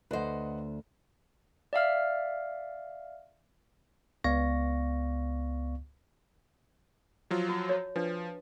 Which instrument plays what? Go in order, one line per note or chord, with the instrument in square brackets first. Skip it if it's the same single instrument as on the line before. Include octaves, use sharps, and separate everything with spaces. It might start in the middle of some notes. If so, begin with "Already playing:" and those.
[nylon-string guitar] D2 C5 [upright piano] B4 D#5 F#5
[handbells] D5 E5 F5 F6
[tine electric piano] C#2 B3 D5 F5 C#6 A#6
[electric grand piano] F3 F#3 F4
[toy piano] F#4
C#5
[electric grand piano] F3 [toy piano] D4 B4